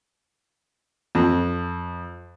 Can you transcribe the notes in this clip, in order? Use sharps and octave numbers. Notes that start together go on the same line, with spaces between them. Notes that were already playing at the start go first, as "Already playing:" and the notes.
F2